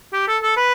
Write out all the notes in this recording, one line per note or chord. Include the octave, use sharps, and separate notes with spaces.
G4
A4
A4
B4